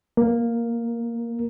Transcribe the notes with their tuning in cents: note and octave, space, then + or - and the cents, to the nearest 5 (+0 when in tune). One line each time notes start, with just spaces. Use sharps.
A#3 +0 A#4 +0